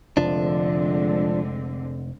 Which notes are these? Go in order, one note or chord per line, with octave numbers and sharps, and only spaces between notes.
F1 D3 F3 G#3 C4 D4